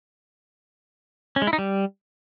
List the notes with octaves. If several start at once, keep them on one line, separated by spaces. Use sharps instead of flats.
C#4
G#3
E4
D#4
G3